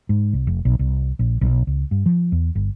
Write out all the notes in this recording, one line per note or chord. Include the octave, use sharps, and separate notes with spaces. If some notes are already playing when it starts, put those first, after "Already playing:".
G#2
C2
F1
B1
C2
A#1
B1
C#2
G2
F3
E2
G1